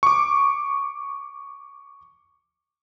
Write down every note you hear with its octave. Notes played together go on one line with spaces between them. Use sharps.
C#6 D6